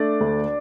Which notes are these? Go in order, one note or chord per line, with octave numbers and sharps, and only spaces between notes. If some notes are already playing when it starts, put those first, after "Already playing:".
Already playing: A3 D4 D5
D2